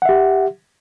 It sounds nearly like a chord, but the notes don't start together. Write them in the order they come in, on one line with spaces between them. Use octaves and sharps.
F#5 E5 G4